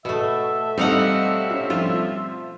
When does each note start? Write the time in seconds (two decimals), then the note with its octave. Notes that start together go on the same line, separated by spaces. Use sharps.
0.05 B2 A3 E5
0.78 G3 A3 C4 D#4 A4 D#5 F5 F#5
1.50 C#4 F4
1.70 F3 F4 C6